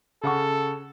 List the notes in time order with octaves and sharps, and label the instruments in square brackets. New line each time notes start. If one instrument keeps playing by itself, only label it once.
[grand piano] C#3 F#5 C#6 [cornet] A4